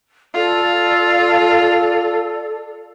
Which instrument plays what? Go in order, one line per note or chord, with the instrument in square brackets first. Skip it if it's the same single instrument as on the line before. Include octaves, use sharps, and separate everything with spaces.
[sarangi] F4 [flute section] A4 D5